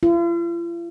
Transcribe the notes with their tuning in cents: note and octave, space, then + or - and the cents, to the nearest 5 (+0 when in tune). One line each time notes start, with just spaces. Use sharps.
F4 -45